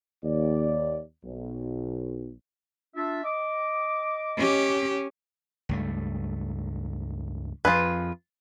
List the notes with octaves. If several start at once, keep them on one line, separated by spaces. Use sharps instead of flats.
D#2 D5
B1
D4 F4 E5
D#5 D6
C#4 G4
C#2 G2 A3
F2 F3 F4 G#4 B4